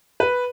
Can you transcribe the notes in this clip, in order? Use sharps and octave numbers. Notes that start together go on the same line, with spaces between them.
B4